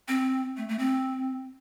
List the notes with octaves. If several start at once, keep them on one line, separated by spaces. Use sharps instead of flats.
C4
A3
A3
C4